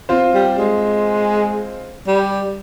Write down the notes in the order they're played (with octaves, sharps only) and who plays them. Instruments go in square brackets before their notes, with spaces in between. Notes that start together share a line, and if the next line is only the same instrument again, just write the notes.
[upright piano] C4 F4 C5
[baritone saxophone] G3
G#3
G3